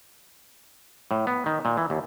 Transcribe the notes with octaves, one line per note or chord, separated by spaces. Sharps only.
A2
B3
D#3
A#2
E3
D#2